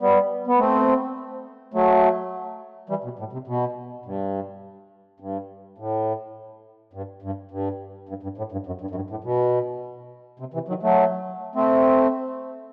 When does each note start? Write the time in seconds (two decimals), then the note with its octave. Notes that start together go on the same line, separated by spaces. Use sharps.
0.01 G3 B3
0.47 B3
0.58 A3 C4
1.74 F#3 A3
2.89 E3 G3
3.04 B2
3.19 A2
3.33 C3
3.47 B2
4.05 G2
5.20 G2
5.78 A2
6.93 G2
7.22 G2
7.51 G2
8.09 G2
8.23 G2
8.38 A2
8.52 G2
8.67 F#2
8.81 G2
8.91 F#2
8.95 G2
9.10 A2
9.24 B2
10.39 C3
10.54 C3 E3
10.68 D#3 F#3
10.83 F#3 A3
11.55 A3 C4